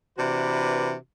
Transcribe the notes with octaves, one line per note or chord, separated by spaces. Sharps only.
C3 E3 D4 F#4 B4